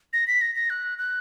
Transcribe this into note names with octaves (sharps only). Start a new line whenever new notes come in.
A#6
B6
A#6
A#6
F#6
F#6